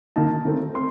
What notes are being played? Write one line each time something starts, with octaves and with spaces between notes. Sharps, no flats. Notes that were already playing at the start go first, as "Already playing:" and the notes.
D#3 A#3 D#4 A5
D#3 A3 C4
C4 C6